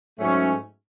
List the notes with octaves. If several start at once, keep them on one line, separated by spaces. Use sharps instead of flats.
G#2 F#3 A3 C#4